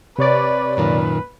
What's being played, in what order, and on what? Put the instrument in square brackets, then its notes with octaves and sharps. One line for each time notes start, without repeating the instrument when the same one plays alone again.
[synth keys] C3 C#5 D5 [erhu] B4
[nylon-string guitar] F#2 A#2 D#3 [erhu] B4